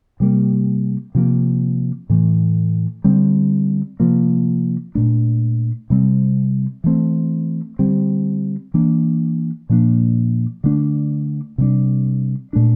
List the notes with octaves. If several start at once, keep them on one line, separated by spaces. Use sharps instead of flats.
C3 G3 A#3
C3 F3 A#3
A2 E3 A3
D3 G3 C4
C3 F3 A#3
A#2 A3 D4
C3 G3 C4
E3 A3 C4
D3 G3 C4
E3 A#3 D4
A#2 F3 A#3 D4
D3 A3 D4
C3 G3 D4
A#2 A3 D4